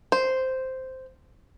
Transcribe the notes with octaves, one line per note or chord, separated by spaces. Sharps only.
C5